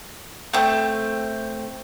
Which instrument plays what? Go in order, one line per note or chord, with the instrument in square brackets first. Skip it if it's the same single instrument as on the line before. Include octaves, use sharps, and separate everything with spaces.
[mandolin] A3 C4